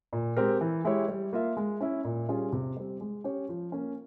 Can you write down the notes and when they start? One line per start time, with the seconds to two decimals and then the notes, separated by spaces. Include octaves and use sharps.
0.13 A#2
0.37 G#3 C4 G4 A#4
0.61 E3
0.84 G#3 E4 G4 C#5
1.08 G3
1.33 A#3 F4 A#4 E5
1.57 G#3
1.81 C#4 E4
2.04 A#2
2.29 G3 C#4 F4 G#4
2.52 C3
2.77 G3 C4
3.01 G#3
3.24 C#4 G4 C#5
3.49 F3
3.72 A#3 C#4